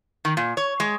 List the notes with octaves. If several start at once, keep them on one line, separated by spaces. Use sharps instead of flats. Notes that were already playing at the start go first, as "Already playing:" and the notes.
D#3
A#2
C#5
G#3